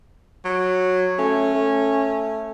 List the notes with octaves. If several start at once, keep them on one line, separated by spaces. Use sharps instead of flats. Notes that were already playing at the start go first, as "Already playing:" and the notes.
F#3
A3 C#4
A3